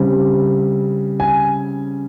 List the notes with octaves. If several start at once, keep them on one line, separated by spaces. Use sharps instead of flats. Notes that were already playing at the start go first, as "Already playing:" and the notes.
Already playing: C#3 G3 C4
G#5